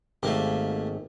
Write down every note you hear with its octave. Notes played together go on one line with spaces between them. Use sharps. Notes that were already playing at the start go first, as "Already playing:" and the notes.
G#1 A3 A#3 G4